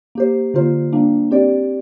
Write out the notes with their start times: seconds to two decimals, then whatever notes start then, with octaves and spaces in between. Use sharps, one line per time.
0.15 A#3 G4 C5
0.54 D3 A#3 F4 C5
0.92 G3 A#3 D4
1.31 C4 G4 D5